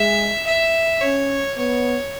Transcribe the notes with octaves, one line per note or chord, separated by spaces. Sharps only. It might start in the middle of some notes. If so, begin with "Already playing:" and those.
Already playing: G#3 E5
E5
C#4 C#5
B3 C#5